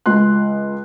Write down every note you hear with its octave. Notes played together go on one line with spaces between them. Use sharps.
C#2 C6 F#6